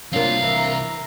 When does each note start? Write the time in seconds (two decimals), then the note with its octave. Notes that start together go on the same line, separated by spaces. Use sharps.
0.13 C2 F#3 A#3 C4 D4 F4 F5
0.43 E3 A#4